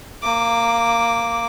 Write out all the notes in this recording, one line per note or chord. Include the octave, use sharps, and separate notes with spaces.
A#3 D6